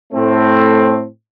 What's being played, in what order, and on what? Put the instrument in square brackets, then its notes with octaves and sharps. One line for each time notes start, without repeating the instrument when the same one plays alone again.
[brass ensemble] A2 A3 C4